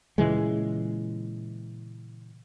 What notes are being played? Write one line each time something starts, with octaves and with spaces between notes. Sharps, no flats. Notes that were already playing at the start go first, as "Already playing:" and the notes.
A#2 C#3 E3 G#3